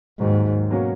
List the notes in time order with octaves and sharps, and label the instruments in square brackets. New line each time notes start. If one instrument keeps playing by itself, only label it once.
[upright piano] D#2 D#3 F#3 [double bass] G#2
[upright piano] B2 F#3 A#3 C#4 F#4